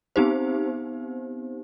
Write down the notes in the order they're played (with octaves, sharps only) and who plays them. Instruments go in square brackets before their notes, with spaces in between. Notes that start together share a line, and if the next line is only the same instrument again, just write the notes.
[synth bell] B3 C4 D#4 G4 C5